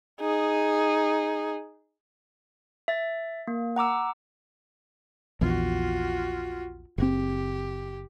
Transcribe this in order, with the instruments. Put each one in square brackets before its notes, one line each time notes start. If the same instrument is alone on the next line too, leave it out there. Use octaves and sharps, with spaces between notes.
[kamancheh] D#4 G#4
[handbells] E5 A6
A#3
F#5 A#5 D6 E6
[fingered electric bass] A#1 E2 [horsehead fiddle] F4 F#4
[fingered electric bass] F#1 C4 [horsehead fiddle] G4